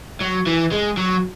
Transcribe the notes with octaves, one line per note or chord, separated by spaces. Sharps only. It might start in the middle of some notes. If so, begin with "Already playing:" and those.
F#3
E3
G#3
F#3